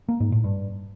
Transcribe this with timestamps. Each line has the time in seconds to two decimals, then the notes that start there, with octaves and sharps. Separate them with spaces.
0.09 A#3
0.20 G#2
0.32 A2
0.44 G2